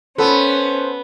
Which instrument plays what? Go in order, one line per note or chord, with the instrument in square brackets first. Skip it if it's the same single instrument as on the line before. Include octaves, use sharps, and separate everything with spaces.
[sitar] B3 [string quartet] C#4 [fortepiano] A4 [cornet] C5